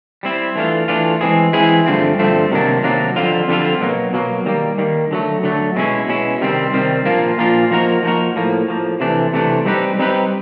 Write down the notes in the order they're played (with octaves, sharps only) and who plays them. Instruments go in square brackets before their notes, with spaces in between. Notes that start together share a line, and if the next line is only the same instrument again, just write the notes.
[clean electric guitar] G3 C4 E4
E3 A3 D4 F4
E3 A3 D4 F4
E3 G#3 C4 E4 G#4
E3 G#3 C4 E4 G#4
G2 D3 F3 A3 C4
G2 D3 F3 A3 C4
C3 D#3 F#3 A#3 D4
C3 D#3 F#3 A#3 D4
F2 D3 G3 C4 F4
F2 D3 G3 C4 F4
B2 F#3 A#3
B2 F#3 A#3
D#3 G3 A#3
D#3 G3 A#3
D3 F#3 A3
D3 F#3 A3
B2 G#3 C#4 E4
B2 G#3 C#4 E4
C3 D#3 G3 C4
C3 D#3 G3 C4
A#2 F3 A#3 D4 F4
A#2 F3 A#3 D4 F4
F3 A#3 D#4 F#4 A#4
F3 A#3 D#4 F#4 A#4
A2 F3 A#3
A2 F3 A#3
C3 E3 A3 D4
C3 E3 A3 D4
G3 C4 D#4 G4 B4
G3 C4 D#4 G4 B4